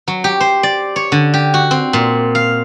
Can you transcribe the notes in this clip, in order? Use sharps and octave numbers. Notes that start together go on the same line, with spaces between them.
F#3
G4
C5
D5
C#5
D3
G4
F#4
C4
A#2
F5